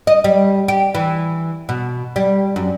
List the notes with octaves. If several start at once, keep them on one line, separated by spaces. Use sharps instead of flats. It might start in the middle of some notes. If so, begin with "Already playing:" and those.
D#5
G3
G4
E3
B2
G3
F#2